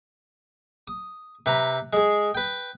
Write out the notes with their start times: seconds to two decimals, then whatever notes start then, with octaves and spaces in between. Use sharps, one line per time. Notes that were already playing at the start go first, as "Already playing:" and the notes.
0.88 D#6
1.46 C3 B4 A#5
1.93 G#3 G#4
2.35 B4 G5